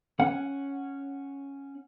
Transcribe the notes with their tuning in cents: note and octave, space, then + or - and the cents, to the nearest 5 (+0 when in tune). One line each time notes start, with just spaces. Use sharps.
C#4 +0 F#5 +0